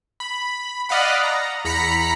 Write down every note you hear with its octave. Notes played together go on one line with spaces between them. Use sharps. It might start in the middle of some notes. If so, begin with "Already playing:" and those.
B5
D5 D#5 F5 F#5 B5
A#5
E2 A#5 B5 B6 C#7